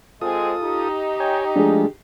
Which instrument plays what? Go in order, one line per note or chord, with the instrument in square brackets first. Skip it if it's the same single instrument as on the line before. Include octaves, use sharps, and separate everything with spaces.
[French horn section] G#3 C4 G#4 [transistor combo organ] F4 A4 D#6
[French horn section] D#4 G4
[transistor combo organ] C#5 G5 G#5
[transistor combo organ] F3 G#3 A3 [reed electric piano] D4 G#4